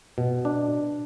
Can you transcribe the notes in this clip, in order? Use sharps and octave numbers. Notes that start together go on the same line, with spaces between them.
B2
D4